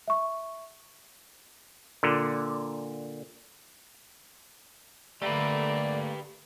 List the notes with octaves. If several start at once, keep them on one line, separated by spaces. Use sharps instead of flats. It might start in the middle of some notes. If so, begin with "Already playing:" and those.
E5 C#6
A#2 D3
D3 A3 A#3 G4 B4 D5